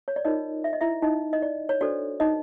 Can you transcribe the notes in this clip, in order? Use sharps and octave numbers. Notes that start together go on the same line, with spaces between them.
C#5
D5
D#4 F4 A#4 C#5 D#5
E5
D#5
E4 E5
D#4 D#5
D#5
D5
C#5
D4 F#4 A4 C5 D5
D#4 D#5